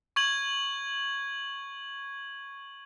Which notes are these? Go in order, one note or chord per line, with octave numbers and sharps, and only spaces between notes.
C#6 G#6 F#7